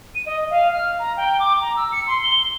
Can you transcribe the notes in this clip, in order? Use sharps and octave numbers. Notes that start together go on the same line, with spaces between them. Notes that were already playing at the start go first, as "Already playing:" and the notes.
D#7
D#5
F5
F6
A#5
G5
D6
A#5
E6
C#7
C6
G7